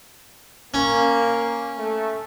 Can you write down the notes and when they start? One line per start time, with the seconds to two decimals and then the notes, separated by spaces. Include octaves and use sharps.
0.74 A#3 C#4
1.78 A3